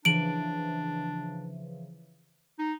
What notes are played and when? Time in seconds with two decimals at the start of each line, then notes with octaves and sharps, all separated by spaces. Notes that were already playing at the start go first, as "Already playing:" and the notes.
0.05 C#3 E3 F3 D4 D7 F#7
2.59 D#4